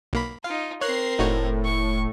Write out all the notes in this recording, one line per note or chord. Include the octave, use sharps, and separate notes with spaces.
B1 A#3 B5
D#4 F4 F5
C4 A#4 C#5 F#6 C7
F1 A2 D#4 F#4 C#5
C#6